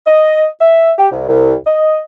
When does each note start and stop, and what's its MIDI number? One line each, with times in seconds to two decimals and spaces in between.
0.07 0.46 75
0.61 0.92 76
0.98 1.08 67
1.12 1.27 36
1.29 1.55 36
1.67 2.00 75